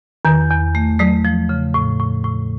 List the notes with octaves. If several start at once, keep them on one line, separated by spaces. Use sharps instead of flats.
E2 D#3
E2
A3
F#3 A3
F3
C#3
A2
A2
A2